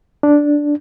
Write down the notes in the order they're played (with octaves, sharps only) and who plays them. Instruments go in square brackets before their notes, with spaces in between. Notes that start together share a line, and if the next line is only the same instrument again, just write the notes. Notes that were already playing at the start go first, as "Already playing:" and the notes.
[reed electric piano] D4